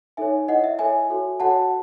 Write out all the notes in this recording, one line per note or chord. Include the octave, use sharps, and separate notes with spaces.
D#4 A4 C#5 E5 G#5
E4 A4 C#5 D#5 F#5
E5
E4 A4 C#5 E5 G#5
F#4 A4 C#5
F#4 A4 C#5 F#5 A5